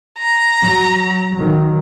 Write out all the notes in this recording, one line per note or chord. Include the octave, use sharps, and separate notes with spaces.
A#5
F#3
D#3 F#3